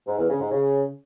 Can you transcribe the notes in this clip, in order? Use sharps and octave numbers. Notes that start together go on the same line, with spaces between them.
G#2
E2
C#3
G#2
C#3